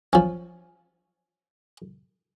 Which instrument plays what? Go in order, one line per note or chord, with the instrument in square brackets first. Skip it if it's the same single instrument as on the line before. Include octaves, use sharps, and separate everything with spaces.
[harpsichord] F3 C#4